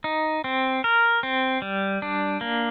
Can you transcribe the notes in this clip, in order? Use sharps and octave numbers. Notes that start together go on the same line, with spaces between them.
D#4
C4
A#4
C4
G3
D4
A#3